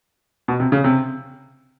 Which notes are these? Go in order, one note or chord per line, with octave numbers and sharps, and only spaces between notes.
B2
C3
C#3
C3